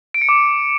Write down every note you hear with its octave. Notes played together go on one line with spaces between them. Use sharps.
D7
C#7
D6